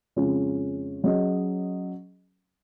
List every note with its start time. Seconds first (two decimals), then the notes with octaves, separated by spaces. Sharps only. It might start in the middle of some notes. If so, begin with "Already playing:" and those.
0.16 F2 C#3 G#3 C#4 F4
1.04 F#3 C#4 G#4 D#5